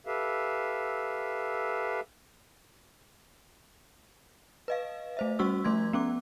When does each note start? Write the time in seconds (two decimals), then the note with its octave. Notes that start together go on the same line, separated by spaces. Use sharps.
0.06 G4 A4 B4 E5 F5
4.68 B4 D#5 F5
5.17 A3 C5 E5
5.39 G3 C#4 F#4 C#6 E6
5.64 F3 A3 C6 G#6
5.93 B3 C#4 D6